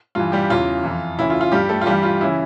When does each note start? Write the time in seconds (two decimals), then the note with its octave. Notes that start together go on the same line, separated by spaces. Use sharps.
0.15 G2 E3 F4
0.32 G3 G4
0.50 E2 C#3 E3 F4
0.84 F2 E3
1.18 D2 C#3 E3 E4
1.30 F4
1.41 F4
1.52 G2 F3 G3 G4
1.69 A3 A4
1.81 F4
1.86 G2 E3 G3 G4
2.03 F4
2.21 C#3 E3 E4